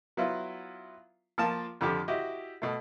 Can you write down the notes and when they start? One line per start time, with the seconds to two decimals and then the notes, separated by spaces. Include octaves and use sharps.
0.17 F#3 B3 E4 F4
1.38 F3 A#3 F4 A5
1.81 F2 D3 F3 G4
2.08 E4 F#4 G4 D#5
2.62 B2 A3